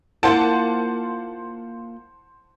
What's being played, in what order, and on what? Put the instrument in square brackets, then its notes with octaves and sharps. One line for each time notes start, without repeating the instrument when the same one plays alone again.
[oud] A#3 F4 A#4 [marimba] E4 [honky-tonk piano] C5 F#5 A5